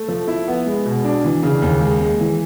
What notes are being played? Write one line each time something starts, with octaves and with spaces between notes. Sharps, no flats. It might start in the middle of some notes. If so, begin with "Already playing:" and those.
Already playing: A3
F3
E4
B3
G#3
B2
D4
E3
C#3
D#2
G#3
G#3
E3